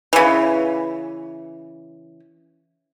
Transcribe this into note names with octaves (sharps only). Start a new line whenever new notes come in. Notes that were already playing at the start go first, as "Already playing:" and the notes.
C#3 E3